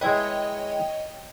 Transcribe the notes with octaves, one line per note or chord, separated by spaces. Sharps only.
G#3 E4 B4 C#5 D#5 G5